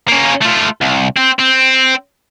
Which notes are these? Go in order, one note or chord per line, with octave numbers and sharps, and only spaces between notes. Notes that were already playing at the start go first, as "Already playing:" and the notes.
A#3 C#4
A3 F4
C2
C4
C4